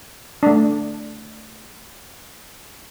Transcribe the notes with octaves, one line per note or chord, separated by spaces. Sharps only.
A3 D4